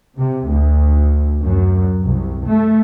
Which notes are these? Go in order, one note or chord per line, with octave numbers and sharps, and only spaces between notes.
C3
D2
F#2
C2
A3